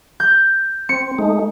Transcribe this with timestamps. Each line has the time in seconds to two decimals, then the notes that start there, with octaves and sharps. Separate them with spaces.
0.20 G6
0.89 C4 C#7
1.18 G#3 A3 D#4